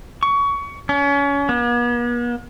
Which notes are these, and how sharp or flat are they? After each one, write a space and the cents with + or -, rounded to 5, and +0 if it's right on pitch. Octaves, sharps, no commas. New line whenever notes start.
C#6 +25
C#4 +30
B3 -45